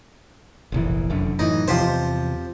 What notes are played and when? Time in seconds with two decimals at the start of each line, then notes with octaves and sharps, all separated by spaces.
0.72 F1 A#1 E3
1.10 F1 F#2 D3
1.39 F#2 A2 E3 D#4
1.68 E2 C3 F3 G4 C5